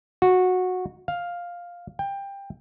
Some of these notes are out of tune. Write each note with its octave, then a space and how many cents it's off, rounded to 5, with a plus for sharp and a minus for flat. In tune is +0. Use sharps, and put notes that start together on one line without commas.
F#4 -15
F5 +5
G5 +20